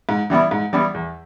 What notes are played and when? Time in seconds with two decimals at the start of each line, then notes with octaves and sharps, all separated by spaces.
0.09 G#2
0.30 E3 G3 B3 E4
0.51 G#2
0.73 E3 G3 B3 E4
0.94 E2